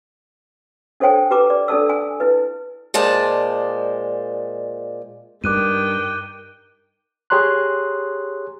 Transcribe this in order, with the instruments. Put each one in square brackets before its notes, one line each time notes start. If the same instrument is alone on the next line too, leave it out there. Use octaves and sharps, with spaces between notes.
[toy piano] D4 A4 C5 C#5 G5 G#5
G4 B4 A#5 D6
D5
D4 A4 D5 A5 E6
G#5
E4 B4
[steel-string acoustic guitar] A#2 G#3 C5 D5 A5
[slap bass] G2 [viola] D#3 G5 [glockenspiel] D6 F#6 D#7
[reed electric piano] G4 G#4 C#5 A#5 C6 F#6